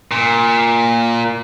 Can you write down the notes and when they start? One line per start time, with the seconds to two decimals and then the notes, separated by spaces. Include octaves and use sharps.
0.11 A#2